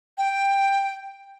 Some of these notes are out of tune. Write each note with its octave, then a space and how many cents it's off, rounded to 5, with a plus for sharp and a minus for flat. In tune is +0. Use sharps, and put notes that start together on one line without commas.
G5 +10